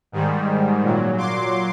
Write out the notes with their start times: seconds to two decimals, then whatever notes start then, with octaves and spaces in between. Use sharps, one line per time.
0.12 G#2 D#3 G3
0.83 A#2 F#3
1.18 C6 D6